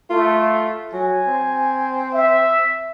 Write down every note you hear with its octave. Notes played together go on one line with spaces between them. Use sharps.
A3 F4
F#3 G#5
C4
E5